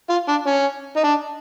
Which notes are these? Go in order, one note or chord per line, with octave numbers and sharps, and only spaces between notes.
F4
D4
C#4
D#4
D4